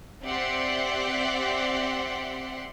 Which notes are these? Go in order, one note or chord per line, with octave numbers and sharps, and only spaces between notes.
C4 G4 D5 E5 F#5 C6